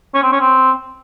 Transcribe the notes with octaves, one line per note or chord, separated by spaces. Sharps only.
C#4
C4
C#4
C4